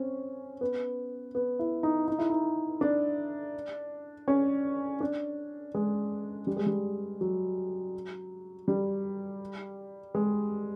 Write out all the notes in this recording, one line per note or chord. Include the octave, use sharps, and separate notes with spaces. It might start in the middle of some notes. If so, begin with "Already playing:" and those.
Already playing: C4 C#4
B3
B3
E4
D#4
D#4
E4
D#4
D4
C#4
D4
G#3
G3
G#3
G3
F#3
G3
G#3